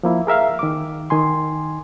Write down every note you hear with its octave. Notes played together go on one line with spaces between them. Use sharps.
F3 A#3 E4
G#4 A#4 E5 F5
D#3 D6
D#3 G#5 C6